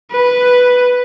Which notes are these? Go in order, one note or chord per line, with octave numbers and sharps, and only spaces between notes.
B4